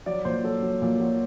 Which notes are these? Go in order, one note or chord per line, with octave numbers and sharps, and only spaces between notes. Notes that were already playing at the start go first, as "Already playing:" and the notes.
F#3 D5
A#2 C5
F#3 A4
F#3
A#2
F#3